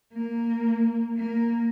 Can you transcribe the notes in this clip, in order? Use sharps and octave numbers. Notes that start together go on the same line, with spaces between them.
A#3
A#3